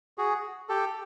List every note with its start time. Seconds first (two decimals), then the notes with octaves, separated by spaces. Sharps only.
0.18 F#4 G#4
0.69 G4 A4